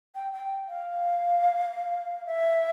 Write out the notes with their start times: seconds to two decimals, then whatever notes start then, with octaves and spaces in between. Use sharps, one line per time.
0.16 G5
0.33 G5
0.68 F5
2.26 E5